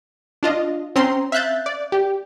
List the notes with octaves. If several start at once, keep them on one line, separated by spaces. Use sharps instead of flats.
D4 F4 D#5
C4 C#4 A#5 C6
E5 F5 F#6 G6 A6
D5
G4